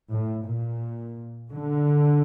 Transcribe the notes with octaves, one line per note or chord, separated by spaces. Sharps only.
A2
A#2
D3